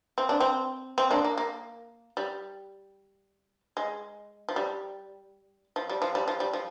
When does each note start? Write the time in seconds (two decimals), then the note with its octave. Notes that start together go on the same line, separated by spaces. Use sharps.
0.18 C4
0.29 D4
0.40 C4
0.98 C4
1.11 A#3 D4
1.24 A#3
1.38 A#3
2.17 G3
3.77 G#3
4.49 F3
4.56 G3
5.76 F3
5.90 G3
6.02 F3
6.15 G3
6.28 F3
6.40 G3
6.53 F3